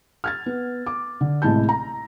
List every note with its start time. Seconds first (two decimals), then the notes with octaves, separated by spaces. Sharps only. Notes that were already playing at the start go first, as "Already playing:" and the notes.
0.24 F6 G#6 A6
0.46 B3
0.87 D6
1.21 D3
1.42 A1 C3 G#3 E4 A5 G6
1.69 A#5